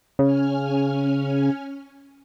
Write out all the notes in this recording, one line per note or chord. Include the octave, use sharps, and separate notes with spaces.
C#3 C#4 G#5 F6